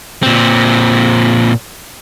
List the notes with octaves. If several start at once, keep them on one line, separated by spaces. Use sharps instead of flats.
A#2 C4